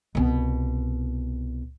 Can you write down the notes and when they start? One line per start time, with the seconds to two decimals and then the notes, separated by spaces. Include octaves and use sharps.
0.15 C2 B2